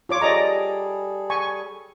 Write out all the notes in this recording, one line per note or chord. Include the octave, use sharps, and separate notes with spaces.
F4 C#5 D6
G3 G#4 A4 D5 D#5 A#5
G#5 C#6